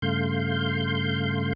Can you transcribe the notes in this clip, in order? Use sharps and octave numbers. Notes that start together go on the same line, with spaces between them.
G2 C#3 A3 F5 C6 G6